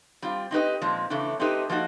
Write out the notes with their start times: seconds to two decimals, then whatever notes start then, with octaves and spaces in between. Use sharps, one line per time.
0.22 G3 C4 F4
0.51 C4 D#4 G4 B4 D#5
0.81 A#2 F3 G#3 C4
1.10 C#3 E3 A3 D4
1.40 A3 C4 D#4 G4 B4
1.69 F3 A#3 D#4 F#4